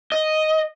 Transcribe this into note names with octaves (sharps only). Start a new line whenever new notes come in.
D#5